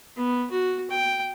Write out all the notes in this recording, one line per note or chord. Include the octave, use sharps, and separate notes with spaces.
B3
F#4
G5